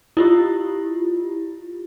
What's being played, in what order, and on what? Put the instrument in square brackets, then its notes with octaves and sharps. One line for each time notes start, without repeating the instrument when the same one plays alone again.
[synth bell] E4 F4 G4